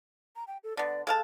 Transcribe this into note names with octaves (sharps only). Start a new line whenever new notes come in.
A#5
G5
A4
D3 B3 D5
G#3 A4 F5 A5